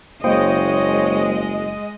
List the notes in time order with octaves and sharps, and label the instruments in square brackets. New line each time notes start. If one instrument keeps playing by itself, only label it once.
[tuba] F#1 [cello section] G#3 D#5 [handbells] A#3 C5 G5 [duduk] C#5